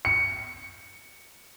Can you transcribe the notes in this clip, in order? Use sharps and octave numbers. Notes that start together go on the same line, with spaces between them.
C#7